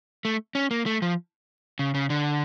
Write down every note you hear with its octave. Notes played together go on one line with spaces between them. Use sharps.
A3
C#4
A#3
A3
F3
C#3
C#3
D3